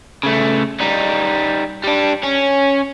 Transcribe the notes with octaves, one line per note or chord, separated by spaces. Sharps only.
C#3 A3
G3 D#4
G3 D4
C#4